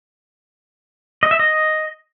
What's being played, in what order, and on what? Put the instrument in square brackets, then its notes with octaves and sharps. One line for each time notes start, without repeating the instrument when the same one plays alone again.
[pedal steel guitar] D#5
E5
D#5